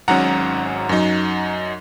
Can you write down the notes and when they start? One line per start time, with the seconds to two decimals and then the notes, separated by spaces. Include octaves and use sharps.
0.08 G#1 G#2 F#3 C#4 F#5 A#5
0.89 F#2 F#3 D#4